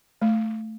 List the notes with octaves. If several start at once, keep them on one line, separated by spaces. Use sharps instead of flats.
A3